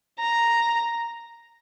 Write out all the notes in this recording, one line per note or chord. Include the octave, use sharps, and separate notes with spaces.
A#5